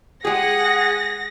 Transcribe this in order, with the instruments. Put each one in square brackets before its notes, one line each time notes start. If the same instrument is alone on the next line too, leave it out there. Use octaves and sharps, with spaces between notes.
[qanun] G#3 G4 [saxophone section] G#4 [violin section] F#5 [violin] A#6